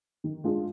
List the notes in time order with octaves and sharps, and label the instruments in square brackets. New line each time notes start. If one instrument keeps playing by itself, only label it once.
[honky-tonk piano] D#3
G#3 D4 F4 G#4